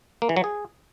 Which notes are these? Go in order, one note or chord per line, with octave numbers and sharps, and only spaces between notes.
A#3
E3
F#3
G#4